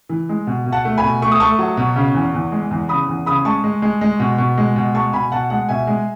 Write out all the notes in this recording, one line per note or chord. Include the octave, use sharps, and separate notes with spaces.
E3
G#3
B2
B2
F#5 A5
A3
G#5 B5
B2
A3 C#6
D#6
A3 A5 C#6
F#3
B2
C#3
E2
E2
G#3
E2
C#3 B5 D#6
E2
C#3 B5 D#6
G#3 A5 C#6
G#3
G#3
G#3
B2
B2
G#3
B2
G#3 A5 C#6
B2 G#5 B5
B2 F#5 A5
G#3 F#5 A5
B2 E5 G#5
G#3